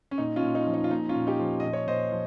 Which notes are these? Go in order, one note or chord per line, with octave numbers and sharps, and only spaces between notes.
C#4
A#2 D#4
C#4 F4
A#2
D#4
F3
D#4
F4
A#2 D#4
C#4 F4
A#2
D#4 G4
F3
A#2 D#5
C#5
A#2 C5 D#5
F3